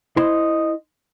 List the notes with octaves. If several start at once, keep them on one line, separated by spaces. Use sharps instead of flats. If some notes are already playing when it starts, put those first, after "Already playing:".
E4 C5 D#5 C6